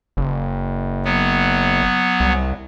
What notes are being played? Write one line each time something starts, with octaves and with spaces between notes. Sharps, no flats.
F#1
F#3 B3
C2